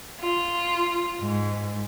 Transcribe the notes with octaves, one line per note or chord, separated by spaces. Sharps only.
F4
G#2